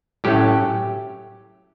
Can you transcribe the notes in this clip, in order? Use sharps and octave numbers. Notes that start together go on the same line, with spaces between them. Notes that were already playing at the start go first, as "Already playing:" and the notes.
A2 F#3 A3 C#4 G4